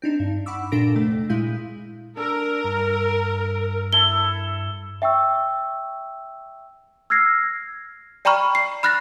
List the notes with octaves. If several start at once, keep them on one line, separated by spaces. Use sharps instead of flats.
C4 D4 D#4
G2
F#5 B5 C#6 D6 E6
A#2 D4 A4 A#4 A#6 D7
F2 C3 A3
A#2 G#3 E4 F5 G6 D#7
D4 A4 A#4
G2
E4 A4 G7
E5 G5 C#6 E6
E6 F6 G#6 A#6 C7
D5 G5 A#5 B5 C#6 F6
C7
B5 F6 F#6 A6 A#6